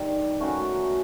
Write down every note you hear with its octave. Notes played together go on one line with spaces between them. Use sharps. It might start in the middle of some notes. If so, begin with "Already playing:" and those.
Already playing: G2 D#3 G3
A3 C#4 F#4 A#4